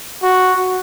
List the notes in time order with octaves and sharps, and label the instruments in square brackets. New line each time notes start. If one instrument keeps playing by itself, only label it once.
[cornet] F#4